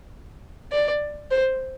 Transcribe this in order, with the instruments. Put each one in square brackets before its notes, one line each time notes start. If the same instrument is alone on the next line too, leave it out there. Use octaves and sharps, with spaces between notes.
[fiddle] D5
C5